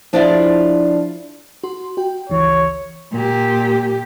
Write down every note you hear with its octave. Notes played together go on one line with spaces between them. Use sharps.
F3 D4 E4 F4 G#4 D5
F#4 C6
F#4 G5
G1 C#2 E3 C#5
A#2 G4